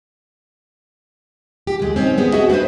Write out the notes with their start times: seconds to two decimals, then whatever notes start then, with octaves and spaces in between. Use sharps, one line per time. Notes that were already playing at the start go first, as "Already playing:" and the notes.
1.67 G4
1.80 D2 G#3
1.96 C4 C#4 D#4
2.18 G#3 B3 G4 G#4
2.33 F#4 G#4 D#5 E5
2.50 B3 D4 F#4 B4 C5